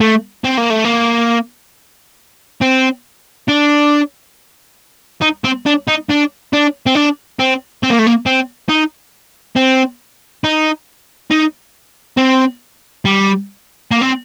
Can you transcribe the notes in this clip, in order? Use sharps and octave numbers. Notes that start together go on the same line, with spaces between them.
A3
C4
A#3
A3
A#3
C4
D4
D#4
C4
D4
D#4
D4
D4
C4
D4
C4
C4
A#3
A3
A#3
C4
D#4
C4
D#4
D#4
C4
G3
A#3
C4